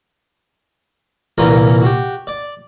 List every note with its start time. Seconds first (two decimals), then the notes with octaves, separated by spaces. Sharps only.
1.38 C2 A#2 E3 C#4 A#4
1.82 F#4 G4
2.27 D5